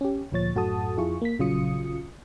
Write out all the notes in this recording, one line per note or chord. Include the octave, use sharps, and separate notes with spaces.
C#4 G4
D2 A#2 F3 C#5 A6
F#2 A2 F#4 A4 A5 D#6
F2 E4 F4 G#4 C#6
A#3 B6
A#1 C#3 F#3 F4 D#6 C#7